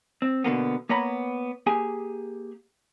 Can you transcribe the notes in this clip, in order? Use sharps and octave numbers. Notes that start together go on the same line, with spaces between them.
C4
B2 D3 A#3 B3
A#3 B3 C#5 A#5 B5
A#3 G4 G#4 G#5